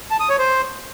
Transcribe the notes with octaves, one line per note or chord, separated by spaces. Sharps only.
A5
D#6
C#5
C5